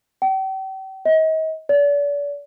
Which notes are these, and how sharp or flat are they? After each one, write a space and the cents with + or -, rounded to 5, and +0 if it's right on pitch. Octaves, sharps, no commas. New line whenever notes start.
G5 -40
D#5 +35
D5 -40